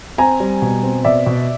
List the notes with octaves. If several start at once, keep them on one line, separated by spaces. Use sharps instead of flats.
C4 G#5 A#5
G3
B2
C4
B2 D5 E5
B2